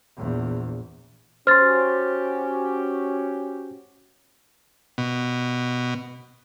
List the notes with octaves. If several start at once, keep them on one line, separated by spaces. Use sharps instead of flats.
A#1 E2
C#4 F#4 G4 C5 C6 F6 A6
B2